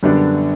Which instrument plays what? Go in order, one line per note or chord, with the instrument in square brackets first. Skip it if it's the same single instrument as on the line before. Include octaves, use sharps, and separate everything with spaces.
[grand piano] F#2 D3 G3 B3 D4